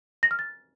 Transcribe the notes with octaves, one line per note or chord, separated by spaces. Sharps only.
A#6
F6
A6